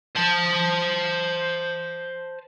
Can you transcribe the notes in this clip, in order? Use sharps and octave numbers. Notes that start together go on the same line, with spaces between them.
C5 A5